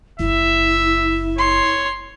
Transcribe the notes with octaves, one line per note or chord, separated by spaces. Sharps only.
F#1 E4 E5
C#5 C6